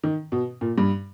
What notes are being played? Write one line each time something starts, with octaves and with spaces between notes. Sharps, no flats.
D#3
B2
A#2
G2